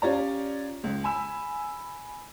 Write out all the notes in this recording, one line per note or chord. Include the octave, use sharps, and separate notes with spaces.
C#4 F4 G4 C#5 D5 A#5
C#2
G#5 B5 E6